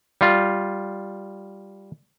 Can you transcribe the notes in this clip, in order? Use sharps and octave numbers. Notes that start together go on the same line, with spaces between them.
G3 F4